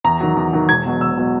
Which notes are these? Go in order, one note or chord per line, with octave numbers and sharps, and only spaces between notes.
E2 A#5
D#3 F#3
E2
D#3 F#3
E1 G#6
E2 B2 F#3
E1 E6
B2 F#3